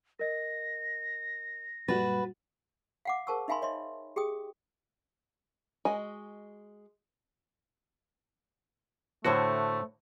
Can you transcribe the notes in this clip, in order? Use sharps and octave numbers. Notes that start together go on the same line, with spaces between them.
A#4 D#5 A#6
F#2 A#2 G3 F#4 B4 A6
F5 F#5 D6
G#4 A#4 C5 A5 C#6 E6
D#4 E5 F5 G#5 B5 C6
C#5 D#5 E5 C6
G4 G#4 G5 D#6
G#3 F#4 D#5 G#5
A2 D3 A3 F#4 A4 C5 C#5